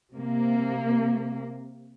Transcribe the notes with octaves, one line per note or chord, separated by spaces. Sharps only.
C3 A#3